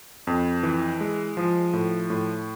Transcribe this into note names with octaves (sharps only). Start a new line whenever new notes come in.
F2
E3
G#3
F3
A2
A2